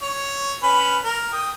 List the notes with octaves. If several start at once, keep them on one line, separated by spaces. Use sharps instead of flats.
C#5
C#4 B4
A#4
G5 D#6